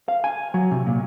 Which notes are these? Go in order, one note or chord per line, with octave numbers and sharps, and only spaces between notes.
F5
G#5
F#3
C3
A#2